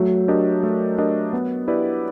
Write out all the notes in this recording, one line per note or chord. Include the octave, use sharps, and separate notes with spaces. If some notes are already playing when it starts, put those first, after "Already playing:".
Already playing: F#3 A3
D4 G4 A#4 D#5
A3
D4 G4 A#4 D#5
B3
E4 G4 B4 D5